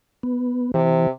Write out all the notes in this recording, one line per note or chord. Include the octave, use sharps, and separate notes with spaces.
B3
C3 E3